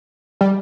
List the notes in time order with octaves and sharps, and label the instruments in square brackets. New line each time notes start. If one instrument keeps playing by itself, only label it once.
[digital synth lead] G3